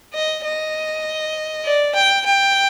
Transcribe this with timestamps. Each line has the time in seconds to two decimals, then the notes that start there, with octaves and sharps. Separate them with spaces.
0.14 D#5
0.44 D#5
1.65 D5
1.95 G5
2.26 G5